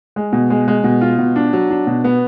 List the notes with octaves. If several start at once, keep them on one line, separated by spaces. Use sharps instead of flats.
G#3
B2
G#3
G#3
B2
F4
B2
D4
F#3
D4
B2
B3